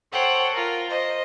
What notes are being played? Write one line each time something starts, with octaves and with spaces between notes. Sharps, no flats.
A4 C5 C#5 F#5 G5
F4 A#4
C5 D#5